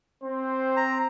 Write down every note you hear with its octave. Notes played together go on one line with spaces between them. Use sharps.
C4 C5
A#5